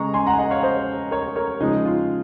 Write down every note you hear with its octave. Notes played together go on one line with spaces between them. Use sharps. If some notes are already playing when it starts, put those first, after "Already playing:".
Already playing: C#3 G#3 A#5 C#6
G#5 C6
F#5 A#5
G#5
D#5 F#5
C#5 F5
C5 D#5
A#4 C#5
A#4 C#5
C#3 F3 G#3 D#4
F4